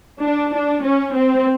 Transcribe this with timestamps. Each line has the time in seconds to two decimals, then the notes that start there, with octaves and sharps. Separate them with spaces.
0.20 D4
0.51 D4
0.82 C#4
1.13 C4